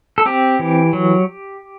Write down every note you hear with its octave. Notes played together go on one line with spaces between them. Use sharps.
A4
C4 G4
E3
F#3